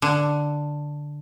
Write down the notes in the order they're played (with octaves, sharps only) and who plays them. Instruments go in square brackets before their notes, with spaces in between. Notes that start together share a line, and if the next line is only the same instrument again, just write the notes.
[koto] D3